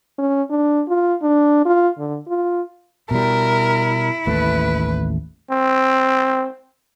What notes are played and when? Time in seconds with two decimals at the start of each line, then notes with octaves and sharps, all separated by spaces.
0.18 C#4
0.50 D4
0.88 F4
1.22 D4
1.66 F4
1.99 D3
2.28 F4
3.11 B2 G3 E4 A#4
4.27 A1 D#2 A3 B4
5.51 C4